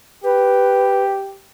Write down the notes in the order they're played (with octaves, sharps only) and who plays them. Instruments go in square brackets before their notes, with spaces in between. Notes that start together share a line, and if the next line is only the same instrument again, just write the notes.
[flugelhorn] G4 [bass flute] B4